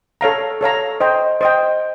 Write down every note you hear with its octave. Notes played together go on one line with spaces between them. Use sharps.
A4 C#5 F5 A#5
A4 C#5 F5 A#5
C5 D#5 G5
C5 D#5 G5